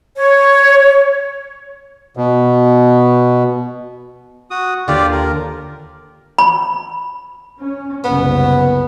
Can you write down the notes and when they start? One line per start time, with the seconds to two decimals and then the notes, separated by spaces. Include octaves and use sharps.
0.16 C#5
2.17 B2
4.51 F#4 D#6
4.88 D#2 D3 F4 G4 D5
5.12 A#4
6.38 B5
7.60 C#4
8.04 F#1 C2 C#3 B3